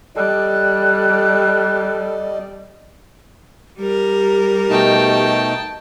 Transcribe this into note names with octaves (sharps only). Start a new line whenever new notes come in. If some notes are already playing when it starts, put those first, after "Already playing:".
G3 A4 D5 D#5 F#6
G3 G4 A#4
B2 A3 D#4 G5 A5